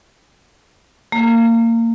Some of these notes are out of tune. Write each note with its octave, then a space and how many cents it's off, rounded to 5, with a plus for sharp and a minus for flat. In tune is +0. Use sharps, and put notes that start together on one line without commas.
A#3 -25